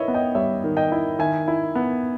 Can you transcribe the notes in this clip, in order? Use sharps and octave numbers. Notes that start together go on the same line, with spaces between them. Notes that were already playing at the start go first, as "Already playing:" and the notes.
Already playing: D#3 E4 B4 C#5 D#5 E5
B3
D#5 G5
G3 C#5 E5
D#3
D#5 G5
E4
D#3 E5 G#5
E4
B3